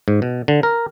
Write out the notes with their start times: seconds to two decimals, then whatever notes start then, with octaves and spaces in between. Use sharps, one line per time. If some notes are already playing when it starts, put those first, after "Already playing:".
0.08 G#2
0.22 B2
0.48 D3
0.63 A#4